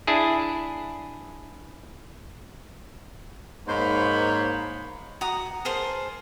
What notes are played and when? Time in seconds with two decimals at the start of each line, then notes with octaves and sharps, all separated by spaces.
0.07 D4 E4 G#4
3.68 G#2 A#3 D#4 C5 C#5 B5
5.21 F#4 A#5 D#6
5.65 G#4 A#4 C5 A5